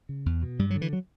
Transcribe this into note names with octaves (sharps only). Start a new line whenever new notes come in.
C#3
E2
B2
G2 G3
F#3
D3
E3
F#3